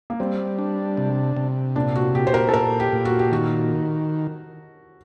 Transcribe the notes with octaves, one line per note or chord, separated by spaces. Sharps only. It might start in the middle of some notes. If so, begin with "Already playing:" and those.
A#3
G3 C4
D4
C3
C3
A#2 D4
F#4
A#2 G4
C5
A#4
A4
A#2 A#4
G4
A#2
F#4
G4
D#3 F#4